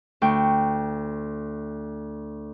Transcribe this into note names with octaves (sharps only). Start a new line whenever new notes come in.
D2 G5 C#6